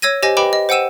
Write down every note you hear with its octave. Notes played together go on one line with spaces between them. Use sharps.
C#5 E6 G#6 A#6 D#7
G4 C5 D#5 G#5 A#6
G4 B4 D#5 G5 B5 D6
D#5
C5 F#5 G5 E6 D#7 E7